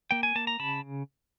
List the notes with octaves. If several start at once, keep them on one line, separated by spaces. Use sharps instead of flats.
A#3 G5
G#5
A#3 A5
A#5
C#3 A5 B5